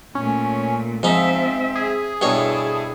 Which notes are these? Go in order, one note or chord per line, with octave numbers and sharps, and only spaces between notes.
A#2 A3 C#4
G#2 F3 C4 D#4 E5
G#4
G2 B2 E4 A4 C#5